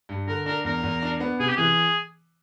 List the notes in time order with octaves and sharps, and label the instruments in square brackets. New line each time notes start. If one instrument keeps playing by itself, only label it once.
[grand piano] G2
[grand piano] D3 [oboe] A#4
[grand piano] D4 [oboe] A#4
[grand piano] E2 [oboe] A#4
[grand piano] E2
D4
B3
[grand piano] C3 [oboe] G#4
[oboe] G4
[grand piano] E3 [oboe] G#4